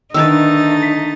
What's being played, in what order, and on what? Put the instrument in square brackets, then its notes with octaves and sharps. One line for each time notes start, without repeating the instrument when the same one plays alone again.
[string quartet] D3 A3 A6 [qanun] D#3 A#4 B4 [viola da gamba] D#4 [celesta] E6
[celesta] B6